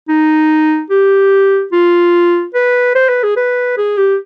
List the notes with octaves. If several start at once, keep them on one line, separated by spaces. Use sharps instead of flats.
D#4
G4
F4
B4
C5
B4
G#4
B4
G#4
G4